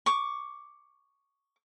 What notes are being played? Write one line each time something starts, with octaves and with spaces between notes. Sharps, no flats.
C#6 D6